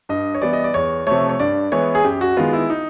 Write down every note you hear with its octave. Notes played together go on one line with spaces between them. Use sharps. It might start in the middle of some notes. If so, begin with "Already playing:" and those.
G2 D#5
C#5
E3 G3 B3 D5
D#5
D5
E2 C#5
C3 F3 A3 C#5
C#5
G2 D5
E3 G#3 B3 C#5
G#4
F#2 G4
F#4
D#3 G#3 B3 F4
E4
D#4